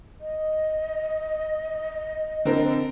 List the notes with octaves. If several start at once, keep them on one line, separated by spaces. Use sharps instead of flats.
D#5
D3 C4 A#4